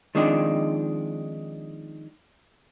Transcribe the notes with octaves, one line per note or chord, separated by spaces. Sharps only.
D#3 F3 G#3 C4 D4 D#4